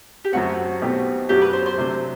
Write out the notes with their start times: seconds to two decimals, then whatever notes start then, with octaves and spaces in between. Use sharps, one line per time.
0.25 G4
0.33 F#2 F#3 A3 C4 F#4
0.82 B1 B2 A3 C4 G4
1.29 F#2 F#3 A3 D4 F#4 G4
1.42 B4
1.53 C5
1.66 C5
1.78 C3 F#3 A3 D4